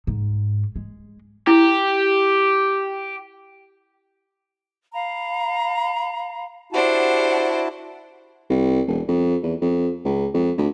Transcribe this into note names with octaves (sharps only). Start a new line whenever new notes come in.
G#2
G#3
E4 G4
F5 A#5 B5
D4 E4 F#4 G4 C5 F#5 A5
C2
E1
F2
E2
F2
C#2
F2
D2